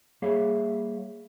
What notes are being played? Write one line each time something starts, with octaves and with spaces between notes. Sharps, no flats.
G3 A#3 G#4 C#5 E5 F5